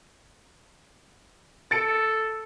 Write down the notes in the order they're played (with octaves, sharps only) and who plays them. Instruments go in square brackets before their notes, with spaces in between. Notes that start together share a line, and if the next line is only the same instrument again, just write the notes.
[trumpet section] A4 [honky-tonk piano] A6 C#7 D7